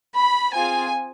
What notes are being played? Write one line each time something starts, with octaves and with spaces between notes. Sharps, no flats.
B5
C4 F4 G#4 G#5